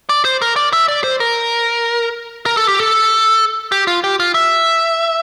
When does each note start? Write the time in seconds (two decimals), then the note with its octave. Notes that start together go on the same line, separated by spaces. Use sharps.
0.09 D5
0.25 C5
0.42 A#4
0.56 D5
0.73 E5
0.88 D5
1.04 C5
1.20 A#4
2.46 A#4
2.57 A4
2.68 G4
2.79 A4
3.72 G4
3.87 F4
4.04 G4
4.20 F4
4.34 E5